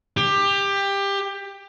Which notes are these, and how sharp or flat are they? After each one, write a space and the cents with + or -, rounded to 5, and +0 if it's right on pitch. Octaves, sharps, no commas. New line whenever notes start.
G4 +20